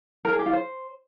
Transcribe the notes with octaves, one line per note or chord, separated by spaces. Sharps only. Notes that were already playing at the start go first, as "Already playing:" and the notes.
A#4
G#4
G4
F4
C5